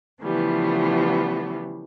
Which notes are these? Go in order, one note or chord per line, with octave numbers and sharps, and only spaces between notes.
C#3 E3 F3 G3 A3 B3